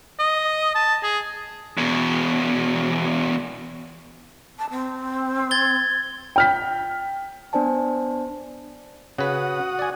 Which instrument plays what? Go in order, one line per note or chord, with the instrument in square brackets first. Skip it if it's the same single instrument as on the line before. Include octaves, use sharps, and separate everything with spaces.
[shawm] D#5
A5
G#4
[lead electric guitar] E2 B2
[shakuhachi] A5
C4
[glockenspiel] G#6 A6 G7
[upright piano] G5 F6 B6
[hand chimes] B3 D4 C5 D5 G#5 A5
[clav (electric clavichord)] C#3 B4 [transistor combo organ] F#4 F#5 D#6
[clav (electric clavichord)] D5 G#5